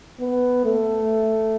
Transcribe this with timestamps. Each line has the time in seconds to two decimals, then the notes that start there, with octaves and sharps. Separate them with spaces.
0.21 B3
0.65 A3